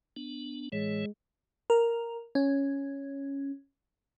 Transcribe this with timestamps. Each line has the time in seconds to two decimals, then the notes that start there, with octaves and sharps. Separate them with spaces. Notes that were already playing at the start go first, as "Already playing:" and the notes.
0.16 B3 D4
0.72 A2 E3 G#3 C#5
1.70 A#4
2.35 C#4